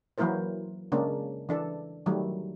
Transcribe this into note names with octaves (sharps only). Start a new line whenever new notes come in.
E3 F#3 A#3 E4 A#4 C5
C#3 G#3 A#3 C#4 D4
E3 D4 A4
D#3 F#3 G3 A3